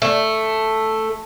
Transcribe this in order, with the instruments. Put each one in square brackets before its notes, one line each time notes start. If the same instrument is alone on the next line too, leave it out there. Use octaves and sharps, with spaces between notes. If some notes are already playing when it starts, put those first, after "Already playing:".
[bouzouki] A3